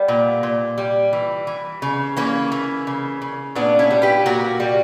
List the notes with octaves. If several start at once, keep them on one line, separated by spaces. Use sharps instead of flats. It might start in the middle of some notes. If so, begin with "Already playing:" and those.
Already playing: G3 B3
A#2
A#2
G3
E3
E3
C#3
E3 A#3 C#4
E3
C#3
C#3
A#2 B3 D4
C#4 E4
G3
G4 B4
A#2 F#4 A#4
G3